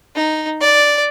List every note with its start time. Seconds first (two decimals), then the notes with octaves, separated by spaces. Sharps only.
0.15 D#4
0.61 D5